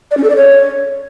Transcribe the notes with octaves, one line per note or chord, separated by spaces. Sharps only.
D5
C#4
A4
D5
C#5